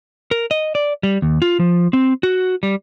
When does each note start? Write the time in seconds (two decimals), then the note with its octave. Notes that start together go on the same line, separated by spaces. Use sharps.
0.31 A#4
0.51 D#5
0.75 D5
1.03 G3
1.22 D#2
1.42 F4
1.60 F3
1.93 C4
2.23 F#4
2.63 G3